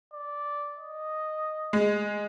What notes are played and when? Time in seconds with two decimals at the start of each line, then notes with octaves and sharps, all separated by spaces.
0.13 D5
0.78 D#5
1.73 G#3